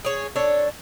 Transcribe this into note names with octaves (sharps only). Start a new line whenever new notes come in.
G#4 C#5
D4 A4 C#5